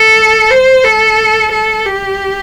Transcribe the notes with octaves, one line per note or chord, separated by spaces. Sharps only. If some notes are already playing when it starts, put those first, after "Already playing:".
Already playing: A4
C5
A4
A4
G4